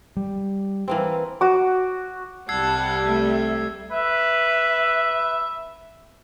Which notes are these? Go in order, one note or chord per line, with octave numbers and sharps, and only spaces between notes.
G3
E3 A#3 C4
F#4 D6
C2 G3 F#5 A5 E6 G#6 C7
A3 E5
B4 E5